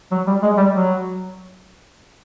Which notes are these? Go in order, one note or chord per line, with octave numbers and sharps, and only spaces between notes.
F#3
G3
G#3
G3
F#3